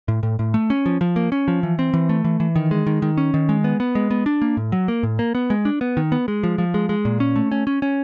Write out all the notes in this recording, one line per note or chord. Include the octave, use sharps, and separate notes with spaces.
A2
A2
A2
A3
C#4
F3
F3
A#3
C#4
F3
E3
C4
E3
A3
E3
E3
D#3
G#3
D#3
D#3
C#4
D#3
G#3
B3
B3
G#3
B3
D4
A#3
A2
F#3
A#3
A2
A#3
B3
G#3
D4
B3
D#3
B3
G#3
F3
F3
G#3
G#3
A#2
C#4
A3
C#4
C#4
C#4